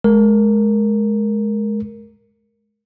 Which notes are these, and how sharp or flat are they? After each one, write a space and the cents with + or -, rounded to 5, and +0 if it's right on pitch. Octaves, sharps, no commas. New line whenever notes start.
G#3 +25 A#4 +0